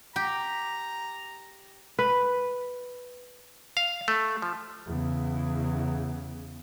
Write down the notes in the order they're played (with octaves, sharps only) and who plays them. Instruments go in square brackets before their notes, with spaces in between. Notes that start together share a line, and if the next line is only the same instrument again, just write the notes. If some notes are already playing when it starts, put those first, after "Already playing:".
[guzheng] G4 [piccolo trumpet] A#5
[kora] B4
[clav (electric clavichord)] F5
A3
F3
[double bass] E2 C#3